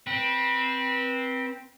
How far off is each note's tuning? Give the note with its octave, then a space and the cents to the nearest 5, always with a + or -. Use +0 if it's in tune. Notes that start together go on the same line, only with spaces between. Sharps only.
C4 +0 B4 -25